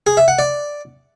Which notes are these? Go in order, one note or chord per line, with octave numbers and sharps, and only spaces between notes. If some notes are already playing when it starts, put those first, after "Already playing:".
G#4
E5
F#5
D5